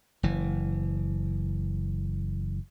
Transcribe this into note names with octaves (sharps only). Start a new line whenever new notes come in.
F#1 E3